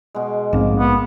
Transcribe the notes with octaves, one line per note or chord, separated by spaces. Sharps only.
B2 G#3
A#1 G#2 A#3 C4
B3